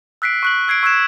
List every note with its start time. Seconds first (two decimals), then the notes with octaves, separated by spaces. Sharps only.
0.22 E6 F#6 B6 C7 D7
0.43 C#6 F#6 F#7
0.68 E6 G#6 C7 D7
0.83 C#6 E6 F#6 G#6 E7